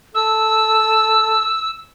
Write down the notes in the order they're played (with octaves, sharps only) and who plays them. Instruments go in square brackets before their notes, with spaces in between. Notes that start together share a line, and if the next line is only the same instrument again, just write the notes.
[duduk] A4 [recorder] E6